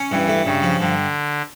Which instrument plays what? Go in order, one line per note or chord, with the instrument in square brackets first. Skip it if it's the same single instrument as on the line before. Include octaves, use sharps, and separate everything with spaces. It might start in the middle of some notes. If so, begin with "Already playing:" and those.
Already playing: [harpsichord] C#4
[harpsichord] G2 [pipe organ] E3
[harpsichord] A3
[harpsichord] G2 [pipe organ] C#3
[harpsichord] F3
[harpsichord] G2 [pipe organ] D3